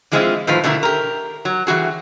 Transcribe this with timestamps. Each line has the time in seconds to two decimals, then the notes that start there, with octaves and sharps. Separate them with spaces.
0.12 E3 F3 G#3 C4 E4 F4
0.47 A2 D#3 F3 B4 C5 F5
0.64 B2 D3 A3 B3 E4 A#4
0.83 G4 A#4
1.45 F#3
1.67 E3 G3 F#4 G#4